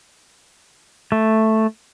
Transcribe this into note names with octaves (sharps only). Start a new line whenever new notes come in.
A3